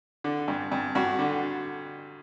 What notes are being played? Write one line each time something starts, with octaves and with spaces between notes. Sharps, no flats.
D3
G2
G2
G2 F#4
D3